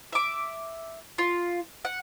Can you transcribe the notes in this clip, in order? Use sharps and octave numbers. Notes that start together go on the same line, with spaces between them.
E5 D6
F4
F#5